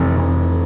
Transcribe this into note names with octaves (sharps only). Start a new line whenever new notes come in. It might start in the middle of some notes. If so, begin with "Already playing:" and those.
Already playing: F1 E3
F1